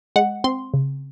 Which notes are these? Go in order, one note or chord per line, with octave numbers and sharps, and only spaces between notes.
G#3 F#5
C4 C6
C#3